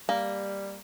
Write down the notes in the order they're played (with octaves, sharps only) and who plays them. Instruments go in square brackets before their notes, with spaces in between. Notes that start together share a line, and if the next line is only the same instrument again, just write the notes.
[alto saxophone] G3 [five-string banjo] A#3